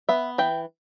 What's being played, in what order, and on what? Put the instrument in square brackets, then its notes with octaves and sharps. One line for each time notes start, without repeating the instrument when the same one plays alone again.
[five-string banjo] B3 E5
E3 G5